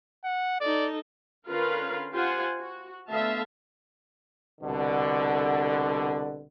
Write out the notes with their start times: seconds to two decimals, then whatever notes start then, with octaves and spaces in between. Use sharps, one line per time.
0.24 F#5
0.61 D#4 A4 D5
1.48 D3 C#4 F4 A#4 B4 F5
2.14 F4 G4 C5 F#5 G#5
2.59 F#4
3.09 D3 A3 B3 E5 F5 A5
4.61 C2 B2 D3